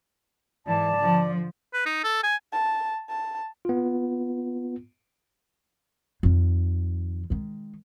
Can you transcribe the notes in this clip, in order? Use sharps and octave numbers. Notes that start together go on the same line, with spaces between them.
G#2 E3 D5 A5
D3 F3
B4
D#4
A4
G#5
A5
A5
B3 F4
F2 D#3
D#3 G#3